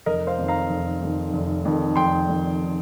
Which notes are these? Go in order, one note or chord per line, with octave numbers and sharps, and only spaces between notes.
F1 A#4 D#5
C5 F5
F2 D#3
F5 A#5
F1
F2 D#3
F1
F2 D#3
F1 G5 C6
F2 D#3